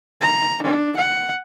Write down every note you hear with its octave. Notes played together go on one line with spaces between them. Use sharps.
A#5
D4
F#5